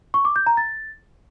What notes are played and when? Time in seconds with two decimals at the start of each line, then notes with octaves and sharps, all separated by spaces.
0.14 C#6
0.25 D6
0.36 G6
0.47 A#5
0.57 A6